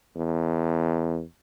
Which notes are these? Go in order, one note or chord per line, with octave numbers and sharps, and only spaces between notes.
E2